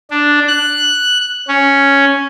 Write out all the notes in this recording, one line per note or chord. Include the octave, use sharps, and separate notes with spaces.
D4
F#6
C#4